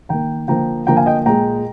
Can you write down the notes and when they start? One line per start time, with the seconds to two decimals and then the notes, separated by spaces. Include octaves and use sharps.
0.09 D#3 A#3 G5 A#5
0.48 D3 F3 A#3 G5 A#5
0.87 D3 F3 A#3 G5 A#5
0.97 F5 G#5
1.06 D#5 G5
1.26 A#2 G#3 G5 A#5